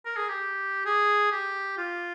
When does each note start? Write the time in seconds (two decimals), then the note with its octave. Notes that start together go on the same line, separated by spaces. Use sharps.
0.05 A#4
0.17 G#4
0.29 G4
0.85 G#4
1.32 G4
1.78 F4